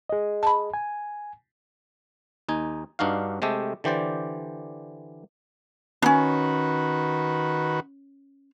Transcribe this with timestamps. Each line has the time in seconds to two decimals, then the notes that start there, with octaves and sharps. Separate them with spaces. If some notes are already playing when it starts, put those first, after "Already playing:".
0.09 G#4 D#5
0.43 A5 B5
0.74 G#5
2.49 D#2 D#4 G#5
2.99 G2 D4 D#4 F#4 F5
3.42 C3 G#3 A3 G4 A4
3.84 D3 E3 G4 C5 D5
6.02 D#3 C#4 D4 F#4 B4